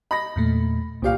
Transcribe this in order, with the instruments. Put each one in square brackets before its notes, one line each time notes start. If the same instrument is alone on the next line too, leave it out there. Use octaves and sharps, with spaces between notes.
[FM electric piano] D#5 [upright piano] B5 A#6
[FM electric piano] E2 A#2 A3
[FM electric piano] C2 D5 [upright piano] A#2 G4 F5